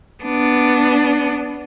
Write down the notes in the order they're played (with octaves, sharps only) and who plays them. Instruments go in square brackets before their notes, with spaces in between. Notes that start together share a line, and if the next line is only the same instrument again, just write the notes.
[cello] B3 D4